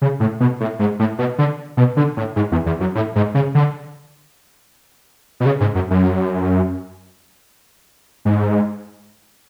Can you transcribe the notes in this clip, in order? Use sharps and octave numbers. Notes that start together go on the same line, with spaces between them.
C#3
A2
B2
A2
G#2
A2
B2
D3
B2
D3
A2
G#2
E2
E2
F#2
A2
G#2
C#3
D3
B2
C#3
G#2
F#2
F#2
G#2